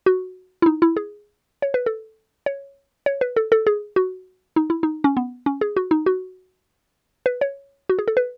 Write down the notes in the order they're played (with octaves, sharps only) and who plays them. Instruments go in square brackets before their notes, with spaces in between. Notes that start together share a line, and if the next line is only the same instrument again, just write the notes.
[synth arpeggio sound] F#4
E4
D#4
E4
G#4
C#5
B4
A4
C#5
C#5
B4
A4
A4
G#4
F#4
D#4
E4
D#4
C#4
B3
C#4
G#4
F#4
D#4
F#4
B4
C#5
F#4
G#4
A4
B4